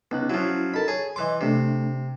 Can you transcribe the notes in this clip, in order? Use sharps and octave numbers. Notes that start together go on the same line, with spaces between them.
C#2 B3 D#4 F#6
F3 F#3 C#4 E4 F#4
D#4 A4 A#4 A5 B5
G#4 C#5
E3 D#5 C6 D6
C3 A3 D4